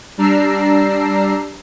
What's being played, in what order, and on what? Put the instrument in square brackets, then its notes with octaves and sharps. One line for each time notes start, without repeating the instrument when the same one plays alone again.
[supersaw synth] G3 D4 A#5 E6 C7